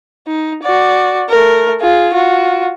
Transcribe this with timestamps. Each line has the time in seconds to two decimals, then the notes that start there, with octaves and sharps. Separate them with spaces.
0.27 D#4
0.62 F#4 D5
1.29 A3 A#4
1.80 F4 G#4
2.13 F4 F#4